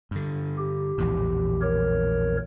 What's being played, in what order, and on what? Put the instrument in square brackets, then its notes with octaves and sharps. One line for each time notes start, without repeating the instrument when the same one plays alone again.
[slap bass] G2 D3
[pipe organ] G4
[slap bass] A#1 E2 A2
[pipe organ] A#4 C#5